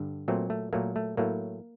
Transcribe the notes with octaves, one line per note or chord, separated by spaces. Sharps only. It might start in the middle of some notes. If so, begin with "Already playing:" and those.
Already playing: G2 D3
A#2 F#3 A3 C4
A3
A#2 F#3 A3 A#3
A3
A2 F#3 A3 A#3